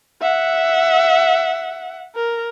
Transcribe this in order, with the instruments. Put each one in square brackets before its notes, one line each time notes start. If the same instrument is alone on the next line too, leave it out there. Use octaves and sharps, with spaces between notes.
[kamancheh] E5 F#5
A#4